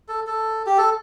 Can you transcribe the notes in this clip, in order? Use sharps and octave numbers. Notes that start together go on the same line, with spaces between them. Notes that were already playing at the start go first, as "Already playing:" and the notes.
A4
A4
G4
A4